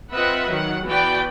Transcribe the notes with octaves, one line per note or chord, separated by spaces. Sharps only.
C4 F4 B4 D#5 E5 F#5
D#3 F#3 F#5
E3 B3 F#4 B4 D5 G5